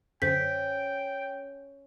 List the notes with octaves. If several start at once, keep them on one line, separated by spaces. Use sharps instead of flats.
F#2 D3 C#4 C5 G5 G6 B6